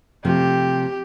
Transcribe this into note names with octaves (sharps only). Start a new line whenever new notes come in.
C3 F3 A3 G4